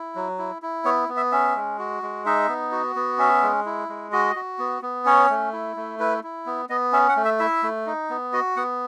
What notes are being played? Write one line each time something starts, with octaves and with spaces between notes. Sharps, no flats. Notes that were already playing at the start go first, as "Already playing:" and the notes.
Already playing: E4
F#3
E4
E4
B3 C#5
B3
E5
C#4 E5
G#3
F#4
G#3
D#4 E5
B3
F#4
B3
C#4 E5
G#3
E4
G#3
F#4 D#5
F#4
B3
B3
C#4 C#5
A3
E4
A3
E4 B4
E4
B3
B3 D#5
C#4 E5
F#5
A3
E5
E4 E5
A3
D#4
B3
F#4 D#5
B3 F#5